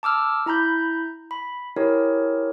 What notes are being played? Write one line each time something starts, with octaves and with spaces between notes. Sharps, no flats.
A5 D6 E6 F6
E4 A#5 B5 G6
B5
E4 G4 G#4 A#4 C#5